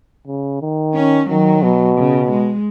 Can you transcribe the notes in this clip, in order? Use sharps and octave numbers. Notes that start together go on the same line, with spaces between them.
C#3
D#3
C#4
D#3 F#3
B2
C#3
G#3